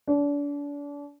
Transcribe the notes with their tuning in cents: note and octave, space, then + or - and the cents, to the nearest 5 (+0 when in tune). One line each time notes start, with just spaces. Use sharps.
D4 -35